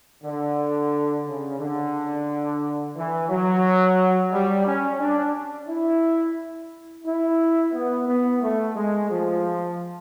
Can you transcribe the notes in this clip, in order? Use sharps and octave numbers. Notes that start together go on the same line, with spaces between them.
D3
C#3
D3
E3
F#3
G3
C#4
D4
E4
E4
B3
B3
A3
G#3
F3